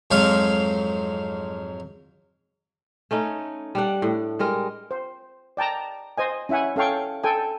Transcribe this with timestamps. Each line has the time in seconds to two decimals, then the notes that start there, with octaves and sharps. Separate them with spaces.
0.11 F2 G#2 F#3 F4 F5
3.11 A3 C#4 D#4
3.75 G3 D4 F#5
4.02 A2
4.39 G3 G#3 A#4
4.91 C5
5.57 D5 G5 A5 A#5
6.18 C5 D#5 G#5
6.49 C#4 E4 E5 F#5 G#5
6.76 C#4 A4 F5 G5 C#6
7.23 A4 G5 G#5